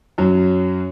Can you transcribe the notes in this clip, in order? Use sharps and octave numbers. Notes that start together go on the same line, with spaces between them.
F#2 F#3